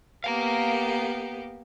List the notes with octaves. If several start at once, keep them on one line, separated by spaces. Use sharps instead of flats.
A#3 B3 G4 F5 G#5 A#5